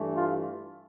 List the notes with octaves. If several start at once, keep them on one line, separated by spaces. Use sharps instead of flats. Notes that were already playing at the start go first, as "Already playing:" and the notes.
Already playing: G2 E3 A3
F4